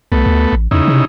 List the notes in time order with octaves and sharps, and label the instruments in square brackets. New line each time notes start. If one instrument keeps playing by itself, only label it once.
[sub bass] C2 [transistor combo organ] A3 B3
[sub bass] D2
A1
[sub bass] E2 [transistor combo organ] C#3 D#4 E4
[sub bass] C3